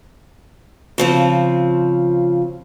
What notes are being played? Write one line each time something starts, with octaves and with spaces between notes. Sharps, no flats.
C#3 F3 C4